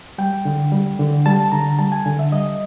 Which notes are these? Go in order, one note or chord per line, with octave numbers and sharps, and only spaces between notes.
G3 G5
D3
G3
D3
G3 A5
D3 A#5
G3 A5
G#5
D3
E5
G3 D#5